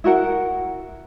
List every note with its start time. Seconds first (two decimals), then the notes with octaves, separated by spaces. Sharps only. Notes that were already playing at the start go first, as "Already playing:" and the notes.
0.04 E4 F#4 A#4 F#5